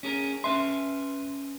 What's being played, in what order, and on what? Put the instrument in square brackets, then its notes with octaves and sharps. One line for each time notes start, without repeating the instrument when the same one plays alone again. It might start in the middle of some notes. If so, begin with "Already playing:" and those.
[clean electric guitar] C#4 G#4 A#4
[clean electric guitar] C#4 B4 E5 [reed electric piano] C6